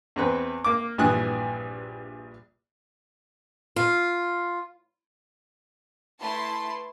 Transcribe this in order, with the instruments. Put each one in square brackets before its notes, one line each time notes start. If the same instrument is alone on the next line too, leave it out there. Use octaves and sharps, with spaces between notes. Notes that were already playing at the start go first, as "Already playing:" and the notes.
[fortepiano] E2 C4 B4
A#3 D6
A#1 G2 E3 G#5 D#6 F#6
[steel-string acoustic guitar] F4
[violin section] A3 E4 B4 A5 C6